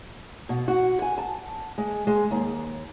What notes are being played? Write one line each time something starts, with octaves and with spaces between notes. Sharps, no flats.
B2
F#4
G#5
A5
G#3
G#3
D#2